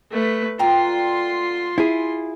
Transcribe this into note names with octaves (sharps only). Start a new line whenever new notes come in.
A3 B4
D3 F4 G5 A#5 C6
E4 G#4